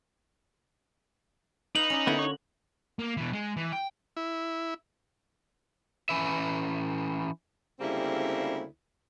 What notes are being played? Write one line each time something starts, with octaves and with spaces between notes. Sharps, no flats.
D#4 B4 F5 F#7
C#4 B4 D5
D3 A#3 B3 E4 F#4
C#5
A#3
B2 E3
G#3
E3
G5
E4
E3 C#4 B4 E5
D2 C#3 G3 A#3 C4 E4